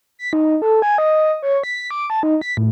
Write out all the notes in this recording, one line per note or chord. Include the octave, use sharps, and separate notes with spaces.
B6
D#4
A4
G#5
D#5
C#5
B6
D6
A5
D#4
B6
A2